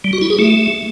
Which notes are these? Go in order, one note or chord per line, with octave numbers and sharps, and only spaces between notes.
G3
F#4
E4
G#4
A3